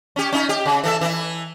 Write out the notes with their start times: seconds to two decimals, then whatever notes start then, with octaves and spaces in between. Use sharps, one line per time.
0.16 C#4 G4
0.33 C#4 D#4
0.49 G4
0.66 C#3
0.84 E3 A4 E5
1.01 E3 E4